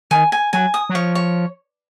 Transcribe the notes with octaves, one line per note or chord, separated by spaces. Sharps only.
D#3 G#5
G#5
F#3 G#5
D#6
F#3
F3 C#5
C#5